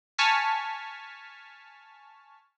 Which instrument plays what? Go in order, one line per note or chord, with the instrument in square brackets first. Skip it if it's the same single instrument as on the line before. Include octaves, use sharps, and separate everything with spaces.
[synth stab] G#5 A5 C#6 F6 B6